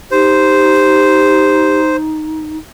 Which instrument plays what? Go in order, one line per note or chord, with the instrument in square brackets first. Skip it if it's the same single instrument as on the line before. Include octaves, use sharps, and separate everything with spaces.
[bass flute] D#4 [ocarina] G4 [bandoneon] C5